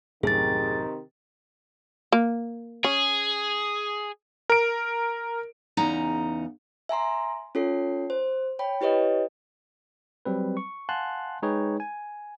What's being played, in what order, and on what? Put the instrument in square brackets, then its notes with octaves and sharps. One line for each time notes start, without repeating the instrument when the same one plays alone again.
[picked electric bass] C2 F#2 A2 [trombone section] C3 D#3 [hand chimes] G#4 A6
[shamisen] A#3
[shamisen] C#4 [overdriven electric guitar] G#4
[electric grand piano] A#4 D7
[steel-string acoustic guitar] E2 C#3 D#4 F#5 A#5
[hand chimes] E5 G#5 A#5 C6
C#4 F4 A4 C#5 C7
C5
C#5 G5 B5
E4 G4 B4 C#5 D#5
[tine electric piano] F#3 G3 C4 B4
C#6
F5 F#5 G#5 A5 C6 F#6
G#3 D#4 G#4 B4 C#5 G5
G#5